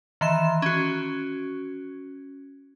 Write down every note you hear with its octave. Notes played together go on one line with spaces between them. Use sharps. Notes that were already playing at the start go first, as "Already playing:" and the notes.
D#3 E3 C6 E7
C#4 F#4